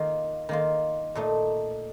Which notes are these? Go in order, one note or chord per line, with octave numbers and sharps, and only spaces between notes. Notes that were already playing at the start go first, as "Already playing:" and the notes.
Already playing: D#3 A#3 F4
D#3 A#3 F4
A#2 A3 D#4